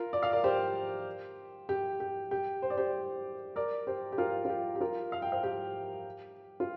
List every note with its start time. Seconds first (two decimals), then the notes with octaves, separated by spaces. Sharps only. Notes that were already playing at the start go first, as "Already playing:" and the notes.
Already playing: F4 A#4
0.13 D5
0.23 F5
0.33 A#4 D5
0.44 G4 C5
1.69 G4
2.00 G4
2.31 G4
2.62 C5
2.70 D5
2.77 G4 C5
3.56 A#4 D5
3.87 G4 C5
4.12 G4
4.18 F4 A#4
4.45 F4
4.50 G4
4.76 G4
4.81 F4 A#4
5.12 F5
5.22 G5
5.32 C5 F5
5.43 G4
6.60 F4